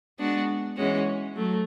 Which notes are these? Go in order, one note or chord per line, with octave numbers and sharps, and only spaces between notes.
G#3 B3 D4 F#4
E3 G#3 C#4 F#4
F#3 A3